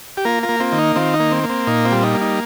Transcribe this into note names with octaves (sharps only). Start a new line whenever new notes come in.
G4
A#3 F4 A#4
F4 A#4
A#3
C4 F4
D#3
D#4
D#3 C4 F4
D#4
A#3
C4
A#3
C4
A#2 D#4
C4 F4
G3
D#4
A#3
D#4